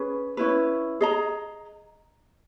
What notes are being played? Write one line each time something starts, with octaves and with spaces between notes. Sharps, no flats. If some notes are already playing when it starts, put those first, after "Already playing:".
Already playing: C#4 G#4 B4
C#4 E4 B4
G#4 D#5 A#5